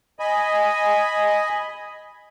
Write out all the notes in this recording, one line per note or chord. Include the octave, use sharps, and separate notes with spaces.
D#5 G#5 B5